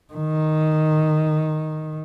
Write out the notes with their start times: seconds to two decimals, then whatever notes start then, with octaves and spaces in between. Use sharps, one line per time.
0.13 D#3